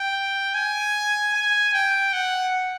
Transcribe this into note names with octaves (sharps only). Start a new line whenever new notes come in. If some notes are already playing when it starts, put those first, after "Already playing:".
Already playing: G5
G#5
G#5
G5
F#5